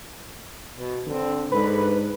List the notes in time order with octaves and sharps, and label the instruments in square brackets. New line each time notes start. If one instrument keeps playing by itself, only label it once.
[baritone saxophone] B2
[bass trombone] D3 [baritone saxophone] C4
[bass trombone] G#2 [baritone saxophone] D3 [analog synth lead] B4